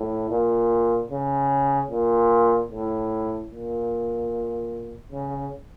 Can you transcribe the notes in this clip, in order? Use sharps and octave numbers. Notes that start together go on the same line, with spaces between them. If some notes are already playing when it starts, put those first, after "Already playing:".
Already playing: A2
A#2
C#3
A#2
A2
A#2
C#3